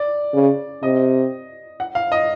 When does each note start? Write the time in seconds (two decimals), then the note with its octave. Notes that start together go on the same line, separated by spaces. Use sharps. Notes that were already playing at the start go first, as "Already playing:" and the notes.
Already playing: D5
0.34 C#3
0.83 C3 D#5
1.80 F#5
1.95 F5
2.12 D#5